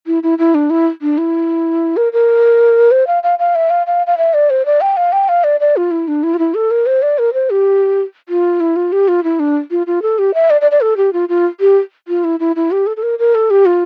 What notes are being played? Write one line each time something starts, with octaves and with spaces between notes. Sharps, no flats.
E4
E4
E4
D4
E4
D4
E4
A#4
A#4
C5
F5
F5
F5
E5
F5
F5
F5
E5
D5
C5
D5
G5
F5
G5
F5
D5
D5
F4
E4
D4
E4
F4
E4
A4
A#4
C5
D5
A#4
C5
G4
F4
E4
F4
G4
F4
E4
D4
F4
F4
A4
G4
E5
D5
D5
D5
A4
G4
F4
F4
G4
F4
E4
E4
E4
G4
A4
A4
A#4
A#4
A4
G4
F4